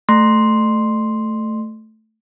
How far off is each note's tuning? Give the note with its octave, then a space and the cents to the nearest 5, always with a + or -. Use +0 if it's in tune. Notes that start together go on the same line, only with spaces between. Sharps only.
A3 +0 C6 +0